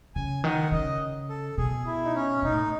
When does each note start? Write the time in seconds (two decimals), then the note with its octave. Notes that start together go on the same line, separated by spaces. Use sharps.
0.15 C#3 G#5
0.44 D#3 F#5
0.72 C#3 D#5
1.29 A4
1.57 B2 G#4
1.86 E4
2.05 D#4
2.15 C#4
2.42 B2 D#4
2.52 A2